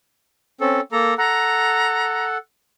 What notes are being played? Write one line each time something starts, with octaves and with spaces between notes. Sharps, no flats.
C4 C#4 A4
A#3 A4 A#5
A4 F#5 A#5